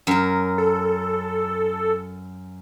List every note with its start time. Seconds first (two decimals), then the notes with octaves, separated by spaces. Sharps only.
0.07 F#2 A#4
0.58 A4